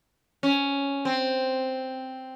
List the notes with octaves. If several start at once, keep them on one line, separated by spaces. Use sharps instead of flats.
C#4
C4